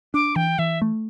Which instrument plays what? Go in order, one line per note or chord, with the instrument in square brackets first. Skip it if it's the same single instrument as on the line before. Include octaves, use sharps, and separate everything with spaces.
[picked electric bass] D4 [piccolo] D6
[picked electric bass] E3 [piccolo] G5
[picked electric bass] E3 [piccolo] E5
[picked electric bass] A3